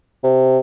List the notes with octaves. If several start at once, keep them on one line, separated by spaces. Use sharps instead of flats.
C3